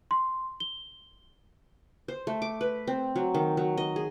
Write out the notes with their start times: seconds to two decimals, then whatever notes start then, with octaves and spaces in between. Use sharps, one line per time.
0.11 C6
0.60 G7
2.08 C5
2.27 A3
2.42 D6
2.61 B4
2.88 C4
3.16 F#3
3.35 D#3
3.57 F#3
3.78 D#5
3.96 G#4